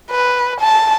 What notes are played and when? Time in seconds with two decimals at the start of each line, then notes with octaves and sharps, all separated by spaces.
0.11 B4
0.61 A5